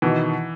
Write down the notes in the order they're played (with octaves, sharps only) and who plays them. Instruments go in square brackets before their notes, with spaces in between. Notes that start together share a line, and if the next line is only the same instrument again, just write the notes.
[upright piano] B2 D#3 [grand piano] E3